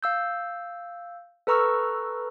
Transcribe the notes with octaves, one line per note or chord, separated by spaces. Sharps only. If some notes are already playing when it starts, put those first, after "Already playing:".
F5 E6 G6
A4 B4 A#5 C#6 E6 F6